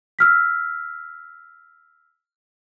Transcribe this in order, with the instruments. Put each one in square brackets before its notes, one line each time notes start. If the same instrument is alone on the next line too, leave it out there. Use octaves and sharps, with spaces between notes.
[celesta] E6 F6 B6